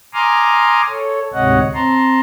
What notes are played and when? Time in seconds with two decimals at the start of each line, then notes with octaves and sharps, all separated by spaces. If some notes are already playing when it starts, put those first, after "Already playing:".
0.14 G#5 A#5 C6 D6 D#6 F6
0.89 A4 C#5
1.33 D2 G#2 C3 C#5 D#5 F#5
1.74 C4 A5 A#5 C6